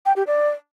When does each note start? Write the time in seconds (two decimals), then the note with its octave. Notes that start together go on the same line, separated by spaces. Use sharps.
0.06 G5
0.16 G4
0.27 D5